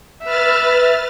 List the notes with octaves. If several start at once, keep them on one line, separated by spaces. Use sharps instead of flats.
B4 E5 F6 A6